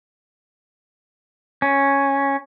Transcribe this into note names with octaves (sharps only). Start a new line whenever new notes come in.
C#4